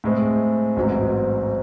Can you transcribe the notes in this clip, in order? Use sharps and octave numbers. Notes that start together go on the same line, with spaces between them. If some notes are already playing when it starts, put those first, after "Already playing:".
A2 G#3 C4
A1 G#2 F#3 C4